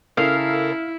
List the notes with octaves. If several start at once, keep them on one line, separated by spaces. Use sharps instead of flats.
C#3 E4 A4 A#4 F5